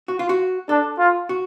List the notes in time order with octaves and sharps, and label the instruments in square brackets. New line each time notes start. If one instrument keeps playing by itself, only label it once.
[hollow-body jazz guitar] F#4
F4
F#4
[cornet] D4 [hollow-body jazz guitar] A4
[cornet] F4
[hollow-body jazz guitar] F#4